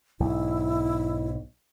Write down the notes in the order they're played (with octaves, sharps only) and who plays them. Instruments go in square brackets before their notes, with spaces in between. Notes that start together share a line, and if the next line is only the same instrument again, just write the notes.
[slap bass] B1 G#2 [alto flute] E4